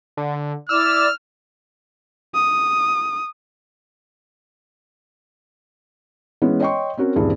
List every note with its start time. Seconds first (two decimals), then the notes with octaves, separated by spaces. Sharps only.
0.17 D3
0.69 E4 D5 D6 E6 F6
2.35 D#6
6.42 E3 G#3 B3 C#4
6.60 C#5 D#5 G5 C6 C#6
6.98 C4 C#4 F#4 A#4
7.16 D#1 G2 E3 C4 G#4